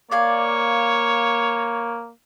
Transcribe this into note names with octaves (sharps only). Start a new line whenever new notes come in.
A#3 C#5 D5 F5 G#5